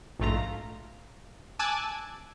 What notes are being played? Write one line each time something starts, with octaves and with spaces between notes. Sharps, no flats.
A#1 G#2 A3 F4 A#5
G#5 A5 D6 E6 F#6 G#6